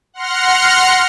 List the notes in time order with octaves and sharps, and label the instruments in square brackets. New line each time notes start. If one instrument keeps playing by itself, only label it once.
[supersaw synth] F#5 C6 F6 A#6 C#7